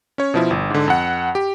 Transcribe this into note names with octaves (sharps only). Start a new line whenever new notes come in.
C#4 C#5
B2 F3 E4
G1
G#2 D3
F2 F#5
G4